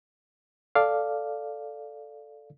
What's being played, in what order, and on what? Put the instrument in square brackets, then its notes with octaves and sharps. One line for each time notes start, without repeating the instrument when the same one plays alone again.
[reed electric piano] A4 D5 F5